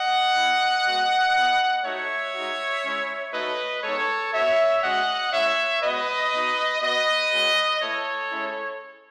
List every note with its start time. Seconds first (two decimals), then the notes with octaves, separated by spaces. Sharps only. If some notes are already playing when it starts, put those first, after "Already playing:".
Already playing: D#5 F#5
0.36 B3 E4
0.86 G#3 B3 F#4
1.35 B3 E4
1.85 A3 D#4 F#4 C#5 E5
2.34 G#3 D#4 F#4
2.84 G#3 C#4 E4
3.34 A3 D#4 F#4 B4 D#5
3.84 G#3 B3 D#4 A4 C#5
4.33 B3 F#4 C#5 E5
4.83 G#3 C#4 F#4 D#5 F#5
5.33 G#3 C#4 E4 C#5 E5
5.82 G#3 B3 F#4 B4 D#5
6.32 B3 D#4 F#4
6.82 B3 F#4 B4 D#5
7.32 G#3 C#4 F#4
7.81 A3 E4 A4 C#5
8.32 G#3 C#4 E4